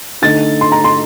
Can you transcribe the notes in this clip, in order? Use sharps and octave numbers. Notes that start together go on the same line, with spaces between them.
D3 A3 D#4 A6
C6
A#5
C6